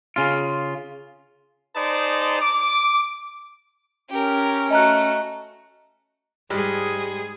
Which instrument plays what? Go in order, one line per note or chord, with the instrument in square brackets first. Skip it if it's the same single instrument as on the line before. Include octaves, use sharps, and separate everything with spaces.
[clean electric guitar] C#3 F4
[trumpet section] D#4 G#4 C5 D5 A5
D6
[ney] C#4 [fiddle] G4 A#4
[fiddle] A3 F#4 [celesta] D#5 A#5 F#6
[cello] G#2 G#4 [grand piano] G3 G#3